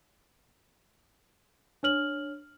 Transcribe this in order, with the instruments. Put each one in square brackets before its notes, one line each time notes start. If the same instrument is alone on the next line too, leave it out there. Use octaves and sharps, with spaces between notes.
[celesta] D4 C#5 F6 F#7